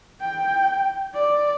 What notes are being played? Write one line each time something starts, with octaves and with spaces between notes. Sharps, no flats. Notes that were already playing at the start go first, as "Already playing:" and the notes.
G5
D5